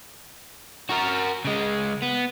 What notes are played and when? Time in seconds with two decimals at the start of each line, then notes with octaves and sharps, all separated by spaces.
0.89 F#4 A#4
1.45 C#3 G#3
2.02 B3